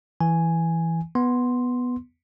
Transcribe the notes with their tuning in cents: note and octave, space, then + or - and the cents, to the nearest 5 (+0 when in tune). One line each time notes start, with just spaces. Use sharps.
E3 +0 G#5 +0
B3 +0 C6 +0